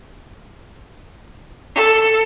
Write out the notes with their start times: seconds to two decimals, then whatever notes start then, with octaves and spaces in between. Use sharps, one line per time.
1.75 A4